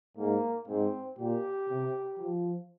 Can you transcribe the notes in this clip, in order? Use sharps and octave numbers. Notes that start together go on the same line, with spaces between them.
G#2 A#3
G#2 C4
A#2 G4
C3
F3